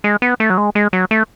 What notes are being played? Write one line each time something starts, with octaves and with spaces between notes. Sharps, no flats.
G#3
B3
A3
F#3
G#3
G#3
F#3
A3